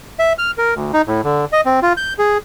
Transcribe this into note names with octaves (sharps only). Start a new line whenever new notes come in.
E5
F6
A#4
D2
D#4
A2
D3
D#5
C4
F4
G6
G#4